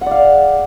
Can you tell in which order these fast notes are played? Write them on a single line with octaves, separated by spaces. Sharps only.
F#5 D5 F5